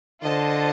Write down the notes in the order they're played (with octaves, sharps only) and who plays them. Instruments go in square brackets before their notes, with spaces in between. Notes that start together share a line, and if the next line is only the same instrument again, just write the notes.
[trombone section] D3 [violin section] F4 C5 D#5 A5